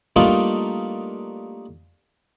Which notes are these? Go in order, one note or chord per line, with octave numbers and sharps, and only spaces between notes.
G3 A3 A#3 D4 D#4 F4